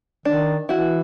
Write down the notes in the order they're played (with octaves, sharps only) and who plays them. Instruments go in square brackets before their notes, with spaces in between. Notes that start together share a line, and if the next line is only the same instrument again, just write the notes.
[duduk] D#3 [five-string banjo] D4
[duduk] E3 [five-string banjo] E4 F#4